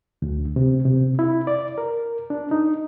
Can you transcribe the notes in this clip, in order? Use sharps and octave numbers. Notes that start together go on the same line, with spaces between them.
D2
C3
C3
E4
D5
A#4
D4
D#4